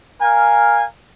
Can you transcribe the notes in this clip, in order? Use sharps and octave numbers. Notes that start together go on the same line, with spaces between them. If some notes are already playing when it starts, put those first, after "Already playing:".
A#4 F5 G#5